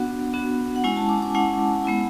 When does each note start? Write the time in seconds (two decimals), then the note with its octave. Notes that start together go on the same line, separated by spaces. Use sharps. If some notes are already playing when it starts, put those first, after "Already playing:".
Already playing: B3 D4 F#4 F#5
0.33 B3 D4 F#4
0.76 F#5
0.84 G#3 C#4 E4 G#5
0.96 A5
1.09 D6
1.22 D6
1.34 G#3 C#4 E4 F#5
1.85 G#3 B3 E4